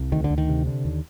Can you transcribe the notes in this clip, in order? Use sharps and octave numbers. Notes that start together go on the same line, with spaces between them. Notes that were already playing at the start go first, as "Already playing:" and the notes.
Already playing: C2
D2 D#3
D3
D2
D#3
C3
D3
D#2